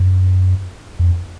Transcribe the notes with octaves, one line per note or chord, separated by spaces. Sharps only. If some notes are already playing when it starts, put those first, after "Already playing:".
Already playing: F#2
F2